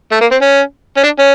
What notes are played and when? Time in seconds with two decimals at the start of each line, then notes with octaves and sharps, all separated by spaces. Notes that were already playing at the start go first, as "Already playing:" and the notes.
0.11 A3
0.21 A#3
0.31 C4
0.41 C#4
0.97 C#4
1.03 D4
1.19 C#4